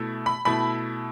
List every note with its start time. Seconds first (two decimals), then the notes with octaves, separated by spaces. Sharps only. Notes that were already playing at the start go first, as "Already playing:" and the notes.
Already playing: B2 A3 E4
0.26 B5
0.45 B2 A3 E4 B5